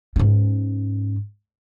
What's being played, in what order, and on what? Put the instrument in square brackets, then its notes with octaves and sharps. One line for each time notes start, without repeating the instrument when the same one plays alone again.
[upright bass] G#2 C#4